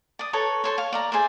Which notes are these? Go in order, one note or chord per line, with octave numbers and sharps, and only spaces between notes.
D5 D#6
A4 B4 C#5 A#5
A4 C5 C#5
C#5 F5
D5 F5 A#5
G#4 C5 D5 E5